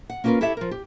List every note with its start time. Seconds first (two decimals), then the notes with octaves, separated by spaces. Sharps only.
0.10 F#5
0.24 A#3 C#4 F4 G#4 A#4 B4
0.41 E4 G4 A4 C#5 E5
0.57 F3 A#4
0.71 G4